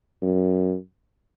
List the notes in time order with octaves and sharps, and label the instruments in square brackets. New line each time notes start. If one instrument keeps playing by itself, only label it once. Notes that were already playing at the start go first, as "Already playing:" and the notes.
[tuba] F#2